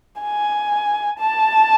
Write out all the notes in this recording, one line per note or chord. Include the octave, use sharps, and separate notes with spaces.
G#5
A5